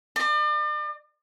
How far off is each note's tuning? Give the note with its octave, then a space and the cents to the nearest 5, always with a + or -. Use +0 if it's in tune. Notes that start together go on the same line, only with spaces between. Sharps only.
D5 +40